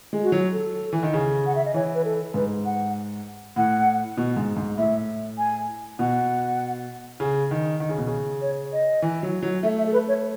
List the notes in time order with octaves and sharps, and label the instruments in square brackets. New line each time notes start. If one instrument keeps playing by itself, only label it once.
[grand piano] G#3
[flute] F#4
[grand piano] F#3
[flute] A4
[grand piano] E3
D#3
C#3
[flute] F#5
E5
D#5
[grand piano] E3 [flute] C#5
[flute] B4
A4
[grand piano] G#2 [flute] B4
[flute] F#5
[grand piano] A2 [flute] F#5
[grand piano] B2
G#2
G#2
[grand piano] A2 [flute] E5
[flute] G#5
[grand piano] B2 [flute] F#5
[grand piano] C#3
D#3
D#3
C#3
B2
C#3
[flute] C#5
D#5
[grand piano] E3
F#3
F#3
[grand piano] A3 [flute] E5
[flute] E5
A4
B4
C#5